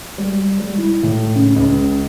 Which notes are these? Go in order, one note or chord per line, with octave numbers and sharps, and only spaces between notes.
G3
G3
E4
A2
C#3
C#2